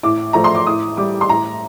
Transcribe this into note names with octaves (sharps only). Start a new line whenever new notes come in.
A2 D6
F3 A3 A#5
C6
D6
A2 D#6
G3 D6
C6
A2 A#5